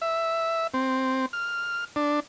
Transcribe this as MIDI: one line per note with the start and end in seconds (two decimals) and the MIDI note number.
0.02 0.67 76
0.74 1.26 60
1.33 1.85 89
1.96 2.20 62